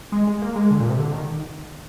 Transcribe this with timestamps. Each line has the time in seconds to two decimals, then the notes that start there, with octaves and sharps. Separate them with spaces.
0.12 G#3
0.27 G#3
0.42 A#3
0.56 G#3
0.71 D3
0.80 A#2
0.89 C3
0.99 D3
1.13 D#3